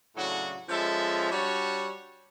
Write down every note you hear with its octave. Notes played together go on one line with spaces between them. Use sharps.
A2 C#3 F#3 D4 F#4
F3 G#3 C#4 A4 E5
G3 D4 F#4 C#5